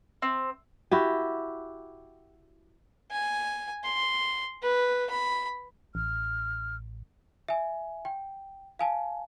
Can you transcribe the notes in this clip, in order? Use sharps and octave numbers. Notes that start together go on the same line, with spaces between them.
C4
E4 F#4 G4
G#5
C6
B4
B5
A1 F6
E5 G#5
G5
F5 G#5 A5